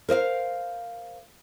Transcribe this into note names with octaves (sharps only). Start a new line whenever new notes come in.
A#4 C5 D#5 F5